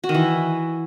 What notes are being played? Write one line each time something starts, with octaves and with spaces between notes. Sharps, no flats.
F#4
D#3
E3